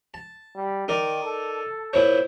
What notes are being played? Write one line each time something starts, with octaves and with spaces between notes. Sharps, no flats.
A5
G3
D#3 D#4 A#4 D5
A4
A#2 E4 C5 C#5